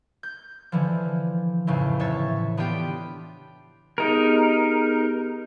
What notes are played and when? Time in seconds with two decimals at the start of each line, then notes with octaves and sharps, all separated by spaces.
0.23 G6
0.72 D3 E3 F3
1.67 F2 A2 C#3 E3
2.00 A2 C#5 E5 A6
2.57 B3 D4 F4 G4 G5
3.98 B3 D#4 G4 G#4 A#4